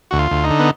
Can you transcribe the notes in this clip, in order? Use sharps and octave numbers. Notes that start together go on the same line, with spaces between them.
D2 F#4
F4
D2
D#4
D3
B3